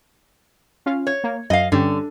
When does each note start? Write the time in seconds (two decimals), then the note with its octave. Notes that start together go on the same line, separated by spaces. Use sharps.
0.86 C#4 F4 F5
1.07 C#5
1.24 A#3
1.50 F#2 D#5 F5
1.72 G2 D3 C#4 G4